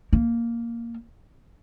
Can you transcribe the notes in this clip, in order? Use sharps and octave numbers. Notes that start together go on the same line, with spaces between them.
A#3